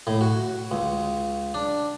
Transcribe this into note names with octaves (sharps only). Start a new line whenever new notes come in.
A2
F#4
C#2
D4